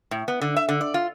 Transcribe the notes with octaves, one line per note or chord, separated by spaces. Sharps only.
A2
B3
D3
E5
D3
D5
F4